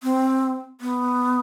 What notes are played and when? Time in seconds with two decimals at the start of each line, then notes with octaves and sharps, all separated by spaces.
0.03 C4
0.81 B3